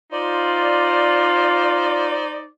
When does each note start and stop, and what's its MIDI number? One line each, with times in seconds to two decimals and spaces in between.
0.13 2.45 63
0.13 2.23 65
0.13 2.45 72
0.13 2.45 74